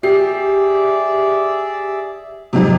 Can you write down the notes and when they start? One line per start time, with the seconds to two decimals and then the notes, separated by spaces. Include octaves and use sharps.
0.03 G4 G#4 D5 E5 C7
2.53 F2 G#2 C3